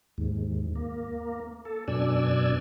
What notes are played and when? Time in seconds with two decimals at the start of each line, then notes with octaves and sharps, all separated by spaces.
0.18 D#2 G#2
0.75 A#3
1.65 A4
1.88 F#2 B2 D4 D5 G#5 E6